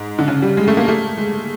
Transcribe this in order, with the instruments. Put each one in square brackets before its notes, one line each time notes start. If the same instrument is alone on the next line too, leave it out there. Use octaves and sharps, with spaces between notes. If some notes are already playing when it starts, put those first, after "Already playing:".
Already playing: [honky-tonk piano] G#2
D3
C#3
G3
G#3
A3
A#3
A3
G#3